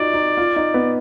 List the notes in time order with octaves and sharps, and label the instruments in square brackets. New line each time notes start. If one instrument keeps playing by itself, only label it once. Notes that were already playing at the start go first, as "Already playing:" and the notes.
Already playing: [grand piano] D#4 F4 F#4 [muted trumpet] D5
[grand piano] D#4
F4
D#4
B3